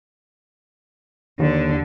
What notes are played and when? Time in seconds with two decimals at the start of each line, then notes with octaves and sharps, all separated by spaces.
1.39 D#2 D3